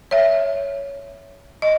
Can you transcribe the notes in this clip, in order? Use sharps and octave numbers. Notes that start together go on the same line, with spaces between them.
C#5 E5
D#5